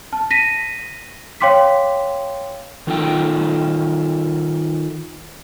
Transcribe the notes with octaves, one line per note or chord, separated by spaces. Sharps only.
A5
A#6 B6 D#7
C#5 F5 G5 C6 D6 B6
D#3 D#4 F4 A4 G5